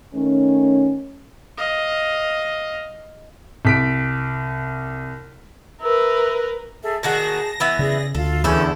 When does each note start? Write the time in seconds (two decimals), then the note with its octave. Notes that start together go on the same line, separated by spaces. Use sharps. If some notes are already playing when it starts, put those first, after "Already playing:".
0.14 D#3 A3 C#4
1.57 D#5 F5
3.65 C2 B6 D7
5.81 A#4 B4 E5
6.83 G#4 A4 E5
7.03 A#2 D#3 F#4 G#4 A5 A#6
7.60 E3 B3 E5
7.79 C#3 G#4 D5
8.15 D2 F4 A4
8.44 E2 D3 C#4 E4 G#4 A4 G6